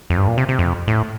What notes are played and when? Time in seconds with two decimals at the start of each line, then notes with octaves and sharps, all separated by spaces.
0.10 F2
0.17 G2
0.28 A#2
0.38 C3
0.49 C3
0.59 F2
0.88 A2